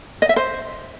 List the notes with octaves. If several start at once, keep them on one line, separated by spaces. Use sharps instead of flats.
D#5
E5
C5